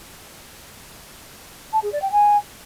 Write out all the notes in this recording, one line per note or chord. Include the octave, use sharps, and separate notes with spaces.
A5
G#4
D5
G5
G#5